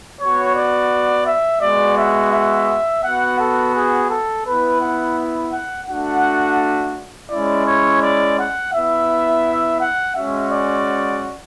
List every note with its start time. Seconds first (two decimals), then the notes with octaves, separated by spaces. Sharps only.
0.20 B3 F#4 C#5
0.55 D5
1.26 E5
1.61 G#3 B3 F#4 D5
1.98 E5
2.33 E5
3.04 B3 F#4 F#5
3.40 A4
3.76 G#4
4.10 A4
4.47 B3 E4 B4
4.82 F#5
5.53 F#5
5.89 A3 D4 F#4 F#5
7.31 G#3 C#4 E4 D5
7.67 C#5
8.03 D5
8.39 F#5
8.74 B3 E4 E5
9.81 F#5
10.16 G#3 C#4 F#4 E5
10.52 D5